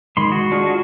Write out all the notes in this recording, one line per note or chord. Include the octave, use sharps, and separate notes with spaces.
D#3 G#3 B5 C6
F#4
D4 F4 G#4